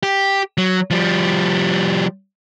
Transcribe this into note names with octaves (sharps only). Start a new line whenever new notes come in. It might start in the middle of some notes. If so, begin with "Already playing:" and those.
G4
F#3
F3 G3